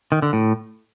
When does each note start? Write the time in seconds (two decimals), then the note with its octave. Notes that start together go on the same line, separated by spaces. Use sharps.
0.12 D#3
0.22 D3
0.33 A2